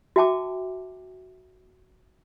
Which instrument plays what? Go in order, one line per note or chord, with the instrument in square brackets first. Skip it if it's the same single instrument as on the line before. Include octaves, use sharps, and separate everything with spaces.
[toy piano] F#4 E5 G5 A5 D6